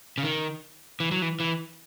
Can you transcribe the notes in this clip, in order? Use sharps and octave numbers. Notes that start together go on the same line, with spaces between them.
C#3
D#3
E3
F#3
E3
E3